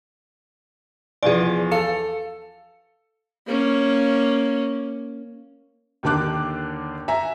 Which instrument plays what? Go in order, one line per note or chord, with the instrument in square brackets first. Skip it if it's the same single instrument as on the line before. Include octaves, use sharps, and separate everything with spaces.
[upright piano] E2 F3 [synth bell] G#4 D5
[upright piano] A4 [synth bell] F5 C#7
[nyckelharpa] A#3 C#4
[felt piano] D#2 D3 D#3 A5 D6 F#6
E5 G#5 A#5